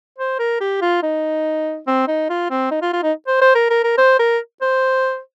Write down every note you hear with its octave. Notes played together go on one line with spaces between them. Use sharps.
C5
A#4
G4
F4
D#4
C4
D#4
F4
C4
D#4
F4
F4
D#4
C5
C5
A#4
A#4
A#4
C5
A#4
C5